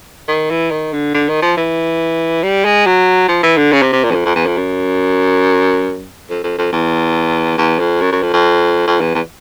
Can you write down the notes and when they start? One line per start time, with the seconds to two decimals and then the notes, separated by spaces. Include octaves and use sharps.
0.28 D#3
0.50 E3
0.71 D#3
0.93 D3
1.14 D3
1.29 D#3
1.42 F3
1.57 E3
2.43 G3
2.65 G#3
2.86 F#3
3.28 F3
3.43 E3
3.58 D3
3.72 C#3
3.82 C3
3.93 C3
4.04 A#2
4.11 E2
4.14 F2
4.26 F2
4.36 E2
4.46 F2
4.57 F#2
6.30 F2
6.44 F2
6.58 F2
6.72 E2
7.58 E2
7.79 F2
8.01 F#2
8.12 F#2
8.23 F2
8.33 F2
8.87 F2
9.01 E2
9.15 E2